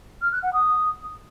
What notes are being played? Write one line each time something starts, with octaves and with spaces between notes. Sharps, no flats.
F6
F#6
F#5
D#6